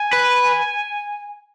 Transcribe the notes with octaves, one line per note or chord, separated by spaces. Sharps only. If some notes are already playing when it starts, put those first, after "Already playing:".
Already playing: G#5
B4